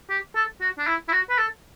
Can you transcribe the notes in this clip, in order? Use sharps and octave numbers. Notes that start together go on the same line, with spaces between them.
G4
A4
F#4
D4
E4
E4
F#4
B4
A4